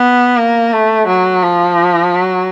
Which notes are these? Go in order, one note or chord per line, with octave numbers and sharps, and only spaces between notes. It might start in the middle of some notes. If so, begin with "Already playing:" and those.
Already playing: B3
A#3
A3
F#3
F3
F#3